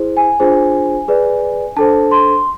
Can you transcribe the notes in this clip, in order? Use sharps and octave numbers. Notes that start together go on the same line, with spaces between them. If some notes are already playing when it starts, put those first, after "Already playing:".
Already playing: E4 G#4 C5
G#5
D4 F4 G#4 C5
G#4 B4 D5
D4 A4 C5 A5
C6